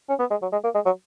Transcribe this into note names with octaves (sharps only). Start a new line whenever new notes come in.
C#4
B3
G#3
F#3
G#3
A#3
G#3
F#3